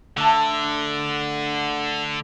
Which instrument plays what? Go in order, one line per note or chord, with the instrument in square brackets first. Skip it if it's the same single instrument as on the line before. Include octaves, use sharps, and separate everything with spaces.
[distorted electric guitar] D3 [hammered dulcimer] A3 A4